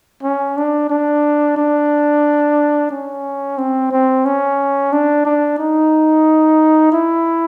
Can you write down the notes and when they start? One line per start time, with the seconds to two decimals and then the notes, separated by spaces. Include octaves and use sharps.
0.23 C#4
0.57 D4
0.90 D4
1.57 D4
2.91 C#4
3.58 C4
3.91 C4
4.25 C#4
4.92 D4
5.25 D4
5.59 D#4
6.92 E4